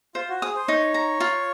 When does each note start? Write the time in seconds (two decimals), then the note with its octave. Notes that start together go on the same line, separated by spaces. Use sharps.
0.15 F4 C5
0.29 F#4
0.42 G#4 D#6
0.56 C5
0.68 D#4 C#5
0.94 A#5
1.20 F4